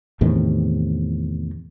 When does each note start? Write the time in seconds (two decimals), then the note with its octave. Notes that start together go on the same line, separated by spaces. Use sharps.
0.21 E2 A2 C3 D#3